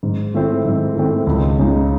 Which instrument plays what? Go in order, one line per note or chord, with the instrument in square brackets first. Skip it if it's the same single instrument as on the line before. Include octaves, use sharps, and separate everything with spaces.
[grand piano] G#2
D#3 A3 C4 E4
G#2
D#3 A3 C4 E4
C#2
C#3 G#3 D#4